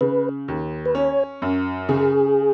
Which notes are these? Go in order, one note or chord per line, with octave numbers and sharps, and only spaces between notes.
C#3 B4
D#2
B4
C#4 C#5
F#2
C#3 G#4